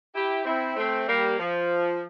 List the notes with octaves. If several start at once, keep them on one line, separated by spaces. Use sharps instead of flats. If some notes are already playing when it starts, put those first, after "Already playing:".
E4 G4
C4 E4
A3 C4
G3 A#3
F3